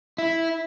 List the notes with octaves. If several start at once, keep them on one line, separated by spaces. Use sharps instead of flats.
E4